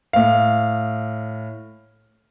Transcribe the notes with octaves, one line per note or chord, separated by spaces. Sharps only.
A2 F5